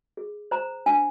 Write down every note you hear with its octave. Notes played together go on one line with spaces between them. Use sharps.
G#4
C5 A#5
D4 G#5